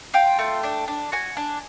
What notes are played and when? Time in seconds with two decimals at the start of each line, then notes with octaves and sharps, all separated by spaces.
0.14 F4 G5
0.39 A3
0.63 D4
0.88 D4
1.12 F#4 G#5
1.37 D4